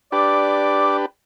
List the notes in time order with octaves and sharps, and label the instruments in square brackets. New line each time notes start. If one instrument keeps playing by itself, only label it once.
[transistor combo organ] D4 G4 B4 [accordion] D5 D6